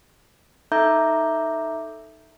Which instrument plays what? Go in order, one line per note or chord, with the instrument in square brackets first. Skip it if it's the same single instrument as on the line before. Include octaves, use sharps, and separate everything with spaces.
[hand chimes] D#4 A4 E5 A#5 D6 G6